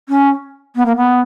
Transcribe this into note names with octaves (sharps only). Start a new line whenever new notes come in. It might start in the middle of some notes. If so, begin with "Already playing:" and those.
C#4
B3
A#3
B3